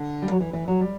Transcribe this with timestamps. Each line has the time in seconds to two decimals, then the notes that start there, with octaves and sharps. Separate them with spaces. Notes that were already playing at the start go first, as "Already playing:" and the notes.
Already playing: D3
0.22 G3
0.31 F#3
0.40 E3
0.53 E3
0.68 F#3
0.81 G3